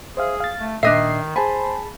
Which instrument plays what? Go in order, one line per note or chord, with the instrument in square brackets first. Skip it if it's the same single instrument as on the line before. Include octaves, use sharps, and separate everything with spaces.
[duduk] G#4 [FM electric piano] C5 E5 F5
[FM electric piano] F5 A6
[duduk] A3
[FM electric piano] A#2 C7 [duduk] D#3 [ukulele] D4 D#5 E5
[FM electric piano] G#4 A5 B5 [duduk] C5 [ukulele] G#5